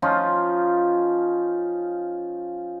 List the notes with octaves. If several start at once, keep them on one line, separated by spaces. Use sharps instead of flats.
F3 C#4 D#4 F4